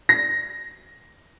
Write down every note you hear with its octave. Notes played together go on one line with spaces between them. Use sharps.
A#6